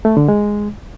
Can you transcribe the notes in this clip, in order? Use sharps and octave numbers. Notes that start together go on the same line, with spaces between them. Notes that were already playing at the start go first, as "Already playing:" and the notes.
A3
D3
G#3